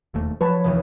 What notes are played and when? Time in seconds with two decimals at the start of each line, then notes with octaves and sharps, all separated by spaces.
0.14 E1 D#2 A3
0.41 F3 F#3 B4 C#5 A5 B5
0.64 F1 D#2 E3